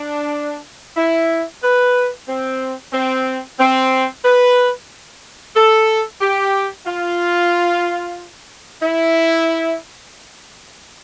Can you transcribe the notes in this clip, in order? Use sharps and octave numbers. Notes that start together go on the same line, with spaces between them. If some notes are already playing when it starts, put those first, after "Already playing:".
Already playing: D4
E4
B4
C4
C4
C4
B4
A4
G4
F4
E4